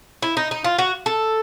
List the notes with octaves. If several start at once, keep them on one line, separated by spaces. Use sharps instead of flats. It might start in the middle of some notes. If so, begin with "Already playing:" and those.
E4
D#4
D#4
F4
F#4
A4